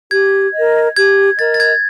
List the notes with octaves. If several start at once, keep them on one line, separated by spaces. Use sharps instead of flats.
G4 G#6
A#4 D#5
G4 G#6
A#4 D#5 A6
A6
G#6